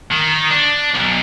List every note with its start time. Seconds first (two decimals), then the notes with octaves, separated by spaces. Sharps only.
0.11 D#3
0.50 D4
0.95 B1